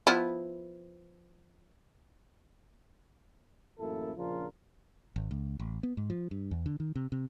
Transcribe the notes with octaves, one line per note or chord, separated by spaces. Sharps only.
F3 B3 E4
A1 F#2 A#3 E4 A4
A#1 C#3 F3 D4 F4 A#4
G#1
C#2
A1
B3
G#2
F3
G2
E2
D3
D#3
C3
C3